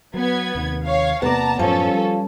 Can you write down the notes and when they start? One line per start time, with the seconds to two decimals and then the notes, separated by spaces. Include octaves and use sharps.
0.14 F#3 B3 G#6
0.55 D#2 C3 D#3
0.84 C#5 F5
1.22 E2 C3 A#3 B3 D5 A5 A#5
1.59 F#2 A2 F3 C#4 A4
1.88 G3